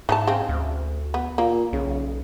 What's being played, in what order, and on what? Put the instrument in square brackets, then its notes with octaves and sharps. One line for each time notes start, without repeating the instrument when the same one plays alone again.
[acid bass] G#2 [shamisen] E3 D#4 A5
[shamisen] C#3 G#3 C4
[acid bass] D2
[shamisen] B3
[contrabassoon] A#2 [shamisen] A#3
[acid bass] B1 [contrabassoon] C#3